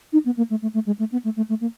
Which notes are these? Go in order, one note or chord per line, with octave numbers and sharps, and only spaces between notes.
D#4
B3
A#3
A3
A3
A3
G#3
A3
B3
A3
A3
A3
A#3